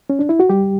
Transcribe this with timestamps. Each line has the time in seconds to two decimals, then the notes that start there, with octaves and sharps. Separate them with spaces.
0.10 C#4
0.19 D4
0.29 E4
0.40 F#4
0.50 G3 G4